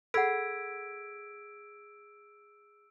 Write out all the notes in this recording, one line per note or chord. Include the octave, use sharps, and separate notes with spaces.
G#4 A4 F#5 B5 E6 G#6 B6 D7